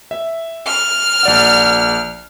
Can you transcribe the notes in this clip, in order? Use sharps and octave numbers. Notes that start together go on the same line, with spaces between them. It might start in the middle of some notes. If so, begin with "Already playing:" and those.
E5
F6
A#1 D5 F#5